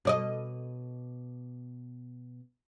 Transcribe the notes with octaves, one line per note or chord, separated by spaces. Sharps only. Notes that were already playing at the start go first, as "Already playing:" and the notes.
B2 D5 D#5